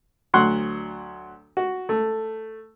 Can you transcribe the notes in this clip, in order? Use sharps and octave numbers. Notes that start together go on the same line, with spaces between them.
D2 F#3 F#5 C6 C#6 F#6
F#4
A3